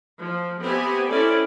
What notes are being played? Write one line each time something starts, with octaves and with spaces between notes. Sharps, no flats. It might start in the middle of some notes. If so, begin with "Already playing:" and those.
F3
B3 C4 G4 E5 G#5
C4 C#4 E4 A4 D5